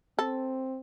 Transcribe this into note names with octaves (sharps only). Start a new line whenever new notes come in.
C4 A4